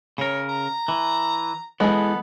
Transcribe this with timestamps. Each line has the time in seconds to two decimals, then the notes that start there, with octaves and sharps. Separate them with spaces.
0.18 C#3 A#4 C#5
0.49 A#5
0.88 E3
1.80 E3 G#3 B3 A4